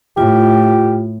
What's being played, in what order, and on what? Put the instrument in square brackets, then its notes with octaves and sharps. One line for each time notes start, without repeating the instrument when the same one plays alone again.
[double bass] A2 [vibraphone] F4 [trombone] G4